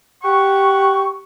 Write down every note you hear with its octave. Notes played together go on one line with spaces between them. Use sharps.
G4 F#5 C#6